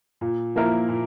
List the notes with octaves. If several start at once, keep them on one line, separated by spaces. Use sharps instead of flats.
A#2
F3 A#3 E4 A#4
A#2